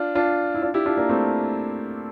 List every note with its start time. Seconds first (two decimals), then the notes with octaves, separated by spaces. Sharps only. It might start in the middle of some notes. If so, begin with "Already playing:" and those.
Already playing: D4 F4
0.15 D4 F4
0.55 E4
0.62 D4 F4
0.74 E4 G4
0.86 D4 F4
0.97 A#3 D4
1.09 A3 C4